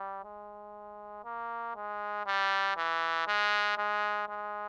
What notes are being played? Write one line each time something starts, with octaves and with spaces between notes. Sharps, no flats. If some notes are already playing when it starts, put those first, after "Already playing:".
Already playing: G3
G#3
A#3
G#3
G3
E3
G#3
G#3
G#3